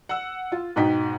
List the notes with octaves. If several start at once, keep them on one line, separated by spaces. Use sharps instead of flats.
F#5 E6
F4
G#2 B2 D#4 G5 B6